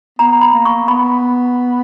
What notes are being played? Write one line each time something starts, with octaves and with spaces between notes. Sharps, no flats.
B3 A#5
B5
A#3
C#6
B3 B5